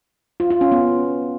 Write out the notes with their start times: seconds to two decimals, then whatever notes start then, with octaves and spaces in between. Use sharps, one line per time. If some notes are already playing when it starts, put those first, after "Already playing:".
0.40 F4
0.50 F4
0.61 C#4
0.72 B3